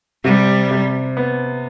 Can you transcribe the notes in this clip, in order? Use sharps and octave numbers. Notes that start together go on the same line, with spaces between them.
C3 G3
C3
B3